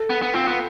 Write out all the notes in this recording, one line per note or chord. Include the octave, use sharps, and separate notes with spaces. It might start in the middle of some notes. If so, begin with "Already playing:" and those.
Already playing: A4
B3
B3
C4 F4
B3